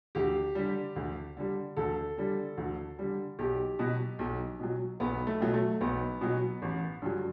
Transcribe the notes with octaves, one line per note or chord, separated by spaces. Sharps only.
D2 G4
D3 G3
D2
D3 G3
D2 A4
D3 G3
D2
D3 G3
B1 G4
B2 F#3
B1
B2 F#3
B1 B3
A3
B2 F#3
A3
B1 B3
B2 F#3
A1
G2 D3 F#3